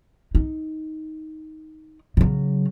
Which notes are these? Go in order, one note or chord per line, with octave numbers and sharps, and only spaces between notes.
D#4
C#3 F#3